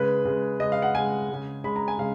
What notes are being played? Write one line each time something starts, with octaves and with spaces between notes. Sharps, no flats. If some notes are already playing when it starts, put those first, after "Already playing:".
Already playing: C#3 G#3 B4
C#3 G#3
C#3 G#3 D#5
F5
F#5
C#3 G#3 G#5
C#3 G#3
C#3 G#3 B5
A#5
G#5
C#3 G#3 F5